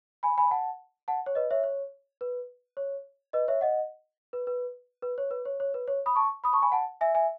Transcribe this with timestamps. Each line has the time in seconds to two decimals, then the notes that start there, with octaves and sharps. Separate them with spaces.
0.23 G#5 B5
0.38 G#5 B5
0.51 F#5 A5
1.08 F#5 A5
1.26 C#5
1.35 B4 D#5
1.51 C#5 E5
1.64 C#5
2.21 B4
2.77 C#5
3.33 B4 D#5
3.48 C#5 E5
3.61 D#5 F#5
4.33 B4
4.47 B4
5.02 B4
5.18 C#5
5.31 B4
5.45 C#5
5.60 C#5
5.74 B4
5.88 C#5
6.06 B5 D#6
6.15 A5 C#6
6.44 B5 D#6
6.53 A5 C#6
6.62 G#5 B5
6.72 F#5 A5
7.01 E5 G#5
7.15 E5 G#5